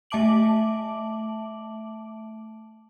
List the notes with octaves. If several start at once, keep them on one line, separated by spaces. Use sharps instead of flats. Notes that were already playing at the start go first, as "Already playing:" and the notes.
A3 E5 A5 D6 D7 F#7